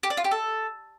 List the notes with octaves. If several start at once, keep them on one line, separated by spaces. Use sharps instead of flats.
G4
D5
F4
G4
A4